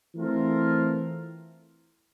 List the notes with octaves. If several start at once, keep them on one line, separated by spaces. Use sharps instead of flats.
E3 A3 C4 F4 A#4